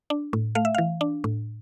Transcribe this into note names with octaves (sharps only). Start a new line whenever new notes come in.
D4
A2
A3 F5
E5
E3 F5
D4
A2